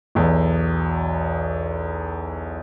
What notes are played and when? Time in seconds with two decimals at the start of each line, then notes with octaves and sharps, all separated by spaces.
0.15 B1 E2